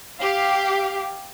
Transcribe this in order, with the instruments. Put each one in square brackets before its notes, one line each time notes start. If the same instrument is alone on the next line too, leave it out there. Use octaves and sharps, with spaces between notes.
[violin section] G4 F5